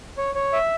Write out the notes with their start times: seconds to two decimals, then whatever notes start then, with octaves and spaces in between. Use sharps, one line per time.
0.18 C#5
0.35 C#5
0.53 E5